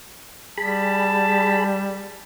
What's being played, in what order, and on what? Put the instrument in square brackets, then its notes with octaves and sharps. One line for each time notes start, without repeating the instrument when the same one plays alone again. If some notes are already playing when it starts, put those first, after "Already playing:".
[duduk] G3 [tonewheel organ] G#4 B5 [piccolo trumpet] A5